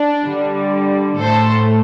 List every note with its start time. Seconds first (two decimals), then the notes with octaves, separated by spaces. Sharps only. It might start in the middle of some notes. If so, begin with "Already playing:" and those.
Already playing: D4
0.23 D3 G3
1.18 A2 A3 A4 C5